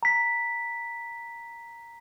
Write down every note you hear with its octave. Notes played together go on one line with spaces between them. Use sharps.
A#5 B6